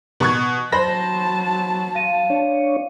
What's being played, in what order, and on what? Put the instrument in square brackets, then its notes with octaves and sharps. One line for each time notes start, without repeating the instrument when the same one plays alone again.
[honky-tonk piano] B2 C#6 G#6
[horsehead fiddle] F#3 A5 [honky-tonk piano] C5 B5 A#6
[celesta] F5 D#7
[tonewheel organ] D4 C#5